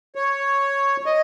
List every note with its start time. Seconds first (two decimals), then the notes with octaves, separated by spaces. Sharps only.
0.15 C#5
1.06 D#5